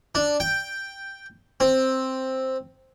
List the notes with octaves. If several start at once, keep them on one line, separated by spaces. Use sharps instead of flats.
D4
G5
C4